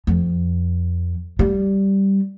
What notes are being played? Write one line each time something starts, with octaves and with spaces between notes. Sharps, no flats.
F2
G3